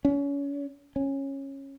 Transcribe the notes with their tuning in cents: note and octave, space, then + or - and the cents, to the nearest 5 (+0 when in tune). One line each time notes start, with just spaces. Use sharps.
C#4 +30
C#4 -15